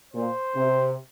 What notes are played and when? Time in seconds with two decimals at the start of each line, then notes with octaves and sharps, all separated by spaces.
0.14 A#2 C5
0.56 C3